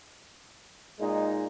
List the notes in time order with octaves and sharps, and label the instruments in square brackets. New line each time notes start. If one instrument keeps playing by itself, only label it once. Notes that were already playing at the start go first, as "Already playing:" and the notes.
[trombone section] A#2 G#3 D#4